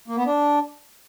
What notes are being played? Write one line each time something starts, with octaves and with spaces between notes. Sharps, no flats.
A#3
B3
D4